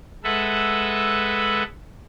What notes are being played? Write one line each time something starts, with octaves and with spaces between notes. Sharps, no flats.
G#3 A4 B4 E5 F#5